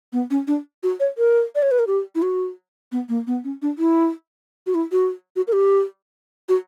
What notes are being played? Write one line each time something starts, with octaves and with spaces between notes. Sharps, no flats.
B3
C#4
D4
F#4
C#5
A#4
D5
C#5
B4
A#4
G4
E4
F#4
B3
A#3
B3
C#4
D4
E4
F#4
E4
F#4
F#4
A#4
G4
F#4